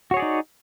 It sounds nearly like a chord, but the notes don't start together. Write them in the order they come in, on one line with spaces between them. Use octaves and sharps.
F#4 C#5 G#4 D5 D#4